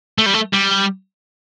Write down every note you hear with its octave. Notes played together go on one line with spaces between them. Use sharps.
A3
G3
A3
G3